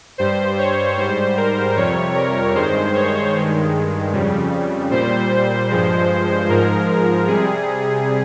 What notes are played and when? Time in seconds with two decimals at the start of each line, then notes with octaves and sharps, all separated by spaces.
0.18 G2 G3 C5
0.58 C#5
0.97 G#2 G3 C5
1.37 A#4
1.76 F2 C3 G3 C#5
2.15 A#4
2.55 G2 D#3 G#3 C5
2.94 C#5
3.34 G2 D#3 G#3
4.13 F2 C#3 G3
4.91 A#2 G3 C5
5.70 G2 F3 G#3
6.49 G#2 F3 G#3 A#4
7.28 C3 G3 G#4